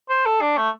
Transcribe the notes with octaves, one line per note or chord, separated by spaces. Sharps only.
C5
A4
D4
A3